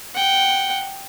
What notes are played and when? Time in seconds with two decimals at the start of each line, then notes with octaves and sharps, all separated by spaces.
0.14 F#5 G5